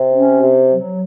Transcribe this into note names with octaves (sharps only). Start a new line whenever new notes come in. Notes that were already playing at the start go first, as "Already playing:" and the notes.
Already playing: C3
C#4
C3
F#3